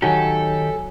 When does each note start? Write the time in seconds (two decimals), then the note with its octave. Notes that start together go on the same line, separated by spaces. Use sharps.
0.02 D#3 F#3 D#4 G4 A4 C#5 G#5